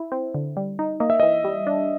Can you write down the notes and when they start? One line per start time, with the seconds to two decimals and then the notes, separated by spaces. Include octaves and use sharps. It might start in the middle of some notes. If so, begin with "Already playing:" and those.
Already playing: E4
0.12 C4
0.34 D3
0.57 G3
0.79 D#4
1.00 A#3 D#5
1.10 E5
1.20 E3 D#5
1.44 G3
1.67 D4